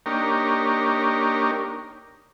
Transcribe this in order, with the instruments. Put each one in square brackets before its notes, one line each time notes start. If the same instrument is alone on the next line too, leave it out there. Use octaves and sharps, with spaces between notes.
[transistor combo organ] A#3 D4 D#4 G4 A#4 C#5